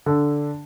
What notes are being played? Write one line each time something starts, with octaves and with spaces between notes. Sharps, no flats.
D3